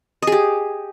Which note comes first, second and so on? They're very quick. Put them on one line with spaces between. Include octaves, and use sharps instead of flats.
D#5 G#4 G4